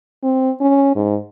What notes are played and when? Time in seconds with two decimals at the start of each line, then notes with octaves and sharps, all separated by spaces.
0.23 C4
0.61 C#4
0.95 G#2